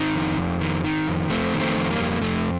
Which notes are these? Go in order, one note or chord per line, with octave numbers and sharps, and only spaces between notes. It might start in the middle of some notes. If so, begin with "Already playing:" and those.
Already playing: D#3 C4 D#4
F2
F2
D#3
D#3
F2
F2 A3 C4
D#3
A3 C4
F2
G3 A#3
F2
F2 A3